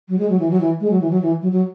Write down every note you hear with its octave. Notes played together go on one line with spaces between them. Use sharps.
F#3
G#3
F#3
E3
F#3
E3
G#3
F#3
E3
F#3
E3
F#3
F#3